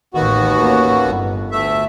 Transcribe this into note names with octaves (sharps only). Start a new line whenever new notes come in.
A1 D#2 D#3 B3 F#4
A#3 C#4
G1
D2 A3 E5